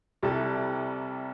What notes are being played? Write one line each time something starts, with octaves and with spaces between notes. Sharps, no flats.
C2 C3 G3 E4 A4